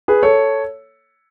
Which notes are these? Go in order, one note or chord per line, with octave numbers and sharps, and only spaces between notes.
G#4 B4
A4 C#5